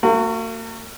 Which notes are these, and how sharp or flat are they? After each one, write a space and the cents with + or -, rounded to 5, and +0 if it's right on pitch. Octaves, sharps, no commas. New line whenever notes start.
A#3 -45 F#4 +0